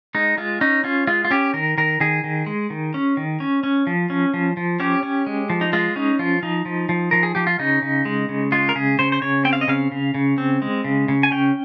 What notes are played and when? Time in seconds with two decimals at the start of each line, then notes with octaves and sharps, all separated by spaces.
0.15 G#3 D#4
0.38 G#3 F4
0.61 C#4 D#4
0.84 C#4 F4
1.07 G#3 F4
1.25 F4
1.31 C#4 G4
1.54 D#3 A#4
1.78 D#3 A#4
2.00 D#3 G#4
2.24 D#3
2.46 G#3
2.70 D#3
2.94 C#4
3.17 D#3
3.40 C#4
3.63 C#4
3.87 F3
4.10 C#4
4.34 F3
4.57 F3
4.80 C#4 G4
5.03 C#4
5.27 G#3
5.50 F3
5.61 D#4
5.73 G#3 F4
5.96 C#4 D#4
6.19 F3 F4
6.43 F3 D#4
6.66 F3
6.89 F3
7.11 F3 A#4
7.23 G#4
7.35 F3 G4
7.47 F4
7.59 C#3 D#4
7.82 C#3
8.05 G#3
8.29 C#3
8.52 G#3 F4
8.69 A#4
8.75 C#3 G#4
8.99 C#3 C5
9.12 C5
9.22 C#3 C#5
9.45 C4 G5
9.53 F5
9.61 D#5
9.68 C#3 F5
9.92 C#3
10.14 C#3
10.38 C4
10.62 G#3
10.84 C#3
11.08 C#3
11.23 G#5
11.31 C#4 G5